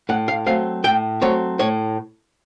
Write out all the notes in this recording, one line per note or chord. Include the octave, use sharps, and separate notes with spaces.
A2 F#5
F5
F#3 A3 C4 F5
A2 G5
F#3 A3 C4 C#5
A2 C#5